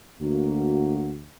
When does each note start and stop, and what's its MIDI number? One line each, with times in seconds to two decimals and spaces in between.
0.21 1.25 38
0.21 1.11 58
0.21 1.11 66